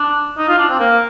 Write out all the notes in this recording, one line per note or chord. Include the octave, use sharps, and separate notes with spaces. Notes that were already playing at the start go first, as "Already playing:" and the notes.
Already playing: D4
D#4
F4
D4
C4
A#3